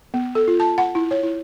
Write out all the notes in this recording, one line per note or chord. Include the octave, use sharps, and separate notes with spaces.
B3
A4
F4
A5
F#5
E4
C#5
E4